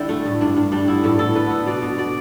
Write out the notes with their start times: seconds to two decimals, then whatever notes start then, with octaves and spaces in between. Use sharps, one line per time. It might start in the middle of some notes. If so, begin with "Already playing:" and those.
Already playing: D3 G3 E4
0.09 A3
0.25 A2
0.41 G2 D4
0.57 G2
0.72 G3 D4
0.88 B3 E4
1.04 A2 A4
1.19 A2 A4
1.35 D3 B4
1.50 B3
1.67 B2 D5
1.82 B2
1.98 B2 D5